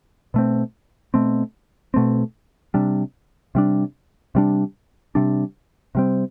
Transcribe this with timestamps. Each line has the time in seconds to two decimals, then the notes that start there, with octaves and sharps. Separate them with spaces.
0.34 B2 A3 C4
1.14 B2 A3 C4
1.94 B2 A3 C4
2.74 C3 G3 D4
3.55 C3 G3 D4
4.35 C3 G3 D4
5.15 C3 G3 D4
5.95 C3 G3 C4